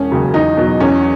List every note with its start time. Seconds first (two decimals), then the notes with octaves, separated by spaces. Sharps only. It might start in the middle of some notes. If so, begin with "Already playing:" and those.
Already playing: E1 C#4
0.11 D#2 C#3 F#3
0.34 E2 D#4
0.57 B2 F#3
0.80 E2 C#4